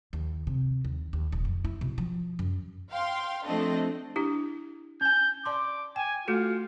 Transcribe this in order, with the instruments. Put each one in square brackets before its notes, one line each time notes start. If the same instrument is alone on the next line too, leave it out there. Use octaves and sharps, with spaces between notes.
[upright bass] D#2
C3
D#2
D#2
D#1
F2
E4
B2
F3
F#2
[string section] F5 G5 C6
F3 A3 C4 D4 A4 D#5
[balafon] D4 E4 G4
[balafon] C#4 G#5 [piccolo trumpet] G6
[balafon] D5 A5 C6 [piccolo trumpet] D6
[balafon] G5 [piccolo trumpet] G#5
[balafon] A3 F#4 A4 [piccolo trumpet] F4